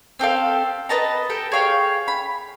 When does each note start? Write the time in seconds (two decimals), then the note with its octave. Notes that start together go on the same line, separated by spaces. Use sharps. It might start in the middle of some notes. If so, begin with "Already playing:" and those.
0.19 C4 G4 A4 F5
0.89 B4 D#5 A5 A#5
1.30 G4 A4 G5
1.52 G#4 C#5 F5 G5
2.08 B5